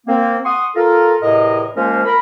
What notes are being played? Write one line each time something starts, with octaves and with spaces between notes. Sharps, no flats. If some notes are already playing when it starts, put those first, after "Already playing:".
A#3 C4
F#5 C6 C#6 D#6
F4 A4 A#4
E2 A2 C3 A#4 D#5
F3 G#3 A#3 C#4 A#4 C5
A#4 B5